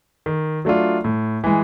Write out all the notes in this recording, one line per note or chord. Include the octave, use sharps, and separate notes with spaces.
D#3
F#3 A3 D4 F4
A2
E3 G#3